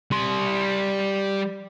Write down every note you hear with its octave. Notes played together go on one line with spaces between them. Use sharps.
G3 C6